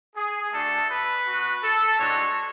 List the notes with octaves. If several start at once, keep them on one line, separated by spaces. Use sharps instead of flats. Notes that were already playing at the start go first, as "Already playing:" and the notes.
G#4
A3 D4 F#4 A4
B4
B3 F#4
A4
G#3 D4 F#4 C#5